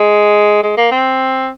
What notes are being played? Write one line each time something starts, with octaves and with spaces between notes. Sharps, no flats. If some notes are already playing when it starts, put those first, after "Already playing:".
Already playing: G#3
G#3
A#3
C4